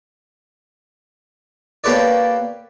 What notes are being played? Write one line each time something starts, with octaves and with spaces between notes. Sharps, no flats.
A#3 G4 A4 B4 C#5 D5